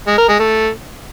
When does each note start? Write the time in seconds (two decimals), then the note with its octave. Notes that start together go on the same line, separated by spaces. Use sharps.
0.07 G#3
0.18 A#4
0.29 G#3
0.39 A3